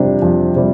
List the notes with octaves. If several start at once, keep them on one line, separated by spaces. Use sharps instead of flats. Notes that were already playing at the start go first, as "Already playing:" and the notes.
Already playing: F2 C3 G3 D4
F2
C3 G3